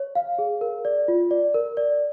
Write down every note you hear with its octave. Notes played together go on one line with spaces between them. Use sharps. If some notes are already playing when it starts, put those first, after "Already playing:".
Already playing: C#5
F5
G#4
A#4
D5
F4
D5
A#4
D5